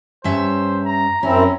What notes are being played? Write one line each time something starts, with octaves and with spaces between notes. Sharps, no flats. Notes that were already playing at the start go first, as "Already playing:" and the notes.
G2 C#4 C5 E5
A#5
F#2 C4 C#4 E4 A#5